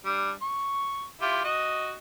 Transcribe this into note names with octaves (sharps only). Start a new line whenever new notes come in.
G3 D4
C#6
E4 F4 G4
F#4 D#5